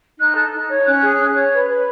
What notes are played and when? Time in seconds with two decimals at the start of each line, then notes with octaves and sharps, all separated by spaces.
0.19 D#4 F#6
0.36 A4
0.53 D#4
0.69 C#5
0.85 C#4 F#6
1.02 G#4
1.18 C#4
1.35 C#5
1.52 B4
1.68 B4